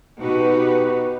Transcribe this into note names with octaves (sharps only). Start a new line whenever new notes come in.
B2 D#4 F#4 G4 B4